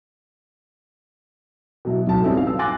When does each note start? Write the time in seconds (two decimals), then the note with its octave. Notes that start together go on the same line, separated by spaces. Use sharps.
1.85 B2 F#3 E4
2.07 D1 B1 A5
2.23 G3 C4 C#4 D#4 E4 A4
2.35 B3 F5
2.47 E6
2.59 G#5 C6 D6 F#6 A6 A#6